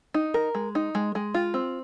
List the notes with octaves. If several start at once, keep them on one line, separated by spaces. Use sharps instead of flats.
D#4
A#4
G#3
D#4
G#3
G#3
F4
C4